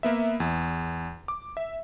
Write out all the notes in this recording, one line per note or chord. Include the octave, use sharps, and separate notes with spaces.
A#3 B3 E5
E2
D6
E5